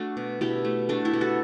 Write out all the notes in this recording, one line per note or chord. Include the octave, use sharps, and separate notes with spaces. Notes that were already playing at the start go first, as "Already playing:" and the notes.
Already playing: A3 D4 F#4
B2
B2 E4 G4
A3
A3 D4 F#4
E4 G4
B2
F#4 A4